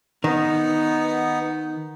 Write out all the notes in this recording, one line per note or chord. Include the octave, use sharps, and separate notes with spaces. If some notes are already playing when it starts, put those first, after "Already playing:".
D#3 B3 D#4